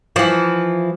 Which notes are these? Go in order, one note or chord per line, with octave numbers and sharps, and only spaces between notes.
E3 F3